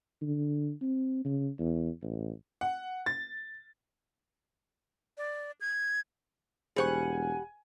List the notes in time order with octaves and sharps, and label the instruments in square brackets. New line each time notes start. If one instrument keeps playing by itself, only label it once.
[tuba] D3
C4
C#3
E2
A1
[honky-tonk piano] F#5
A6
[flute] D5
G#6
[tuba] E1 [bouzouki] G3 F#5 [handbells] G#4 C5 C#6 [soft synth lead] G#5